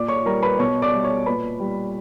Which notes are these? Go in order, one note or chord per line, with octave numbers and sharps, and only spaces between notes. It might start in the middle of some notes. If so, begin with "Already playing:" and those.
Already playing: A#2 D5 D6
C#5 C#6
G3 A#4 A#5
B4 B5
B2 C#5 C#6
D5 D6
G3
C#5 C#6
A#2 B4 B5
G3